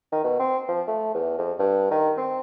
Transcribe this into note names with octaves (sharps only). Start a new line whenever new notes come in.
D#3
B2
C4
F3
A3
E2
F2
G2
D#3
C4